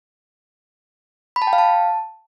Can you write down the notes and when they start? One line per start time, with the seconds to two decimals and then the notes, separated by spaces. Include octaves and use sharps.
1.36 B5
1.42 A5
1.47 G5
1.53 F5
1.58 A5